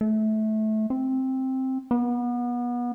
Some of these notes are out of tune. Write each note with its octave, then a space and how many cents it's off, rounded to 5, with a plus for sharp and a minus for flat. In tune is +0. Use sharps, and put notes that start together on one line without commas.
A3 -20
C4 +5
B3 -30